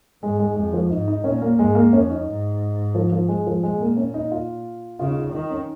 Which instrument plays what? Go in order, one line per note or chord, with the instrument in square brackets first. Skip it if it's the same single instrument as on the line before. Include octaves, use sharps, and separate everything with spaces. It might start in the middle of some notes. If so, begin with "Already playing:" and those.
[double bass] G#2 [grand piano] G#3
[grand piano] G#3
[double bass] F2 [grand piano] G#3
[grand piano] F3
[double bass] G#2 [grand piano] D#4
[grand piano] D#4
[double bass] A#2 [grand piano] C#4
[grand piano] A#3
[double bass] G#2 [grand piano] G#3
[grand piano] A#3
[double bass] F2 [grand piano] C#4
[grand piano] D#4
[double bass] G#2
[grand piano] F3
F3
G#3
F3
[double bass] A#2 [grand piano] G#3
[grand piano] A#3
C#4
D#4
F4
[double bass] C#3 [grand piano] F4
[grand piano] D#4
F4
[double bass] D#3 [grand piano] D#4
[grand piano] C#4